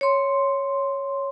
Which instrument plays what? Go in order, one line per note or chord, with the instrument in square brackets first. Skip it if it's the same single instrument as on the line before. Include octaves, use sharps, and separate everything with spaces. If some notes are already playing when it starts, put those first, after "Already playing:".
[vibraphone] C#5 C6